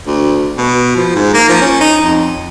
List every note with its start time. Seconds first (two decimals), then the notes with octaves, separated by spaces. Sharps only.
0.07 D2
0.57 B2
0.96 F3
1.15 G#2
1.34 A#3
1.49 F3
1.61 C#4
1.80 D#4
2.01 F2